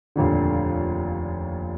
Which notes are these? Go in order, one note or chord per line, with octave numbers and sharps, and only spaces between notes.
F1 D#2 A#2 D3